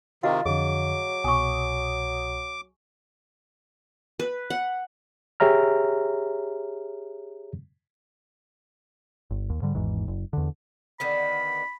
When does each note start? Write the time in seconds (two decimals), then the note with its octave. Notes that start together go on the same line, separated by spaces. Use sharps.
0.23 C3 D#3 F4 F#4 D#5 F5
0.46 F2 D3 F#3 G#4 D6
1.24 C2 B2 G#5 C#6 D#6
4.20 B4
4.50 F#5
5.40 G4 G#4 C#5 E5 A#5 F6
9.31 G1
9.50 D#2
9.62 G#2 D3 G3
9.75 G#1 E2 G#2 E3
10.08 F#1
10.33 E2 D3
11.00 D3 D#3 B3 B5